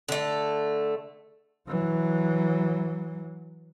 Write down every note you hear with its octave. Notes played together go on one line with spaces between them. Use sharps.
D3 A3
E3 F#3